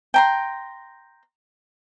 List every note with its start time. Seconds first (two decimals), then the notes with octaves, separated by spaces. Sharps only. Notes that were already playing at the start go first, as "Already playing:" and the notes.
0.14 G5 A#5 C6